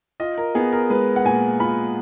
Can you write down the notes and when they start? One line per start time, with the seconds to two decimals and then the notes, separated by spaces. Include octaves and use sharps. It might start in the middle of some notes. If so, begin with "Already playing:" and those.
0.20 F4 D#5
0.38 A#4
0.55 B3 G#4
0.73 A#4
0.90 G#3 B4
1.16 F#5
1.25 A#2 G#5
1.60 F4 B5